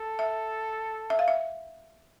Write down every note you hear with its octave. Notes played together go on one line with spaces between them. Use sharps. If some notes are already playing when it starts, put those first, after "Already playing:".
Already playing: A4
E5
E5
F5
E5